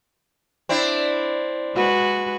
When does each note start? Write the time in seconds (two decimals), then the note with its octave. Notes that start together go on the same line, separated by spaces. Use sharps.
0.69 C4 D4 E4
1.75 G#3 F#4 B4